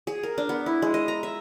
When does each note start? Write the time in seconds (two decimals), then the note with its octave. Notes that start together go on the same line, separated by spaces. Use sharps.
0.07 G#4
0.23 A#4
0.38 D4
0.49 B3
0.66 E4
0.82 G#3
0.94 D#5
1.08 A#5
1.23 E5